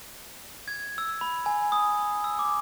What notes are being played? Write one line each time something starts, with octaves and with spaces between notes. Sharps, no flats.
G#6
E6
B5
G#5
D#6
E6
D6